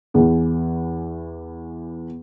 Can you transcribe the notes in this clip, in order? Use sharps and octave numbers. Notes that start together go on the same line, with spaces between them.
E2 E3